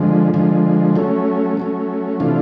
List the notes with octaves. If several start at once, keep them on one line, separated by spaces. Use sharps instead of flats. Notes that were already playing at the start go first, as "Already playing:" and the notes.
Already playing: D3 F3 G#3
D3 F3 G#3
F#3 A3 C#4
F#3 A3 C#4
C3 E3 A3 D4 F4